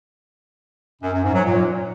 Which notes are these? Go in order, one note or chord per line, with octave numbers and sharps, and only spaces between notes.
F#2
F#2
G#2
F#3
A#2